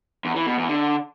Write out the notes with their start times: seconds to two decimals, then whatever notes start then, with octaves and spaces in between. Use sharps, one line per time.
0.25 E2
0.36 E3
0.47 B2
0.58 E2
0.69 D3